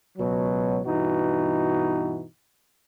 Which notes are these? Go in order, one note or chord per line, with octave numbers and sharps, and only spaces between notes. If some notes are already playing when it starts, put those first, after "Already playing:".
C#2 B2 F#3
G2 B2 E3 D#4 F#4